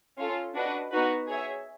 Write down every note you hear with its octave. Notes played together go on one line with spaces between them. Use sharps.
C#4 F4 A4
D4 F#4 B4 D#5
B3 D#4 F#4 B4
G#4 C#5 E5